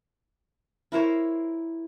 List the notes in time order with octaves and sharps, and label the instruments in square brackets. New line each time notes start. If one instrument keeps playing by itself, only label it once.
[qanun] E4 A#4 C5 C#5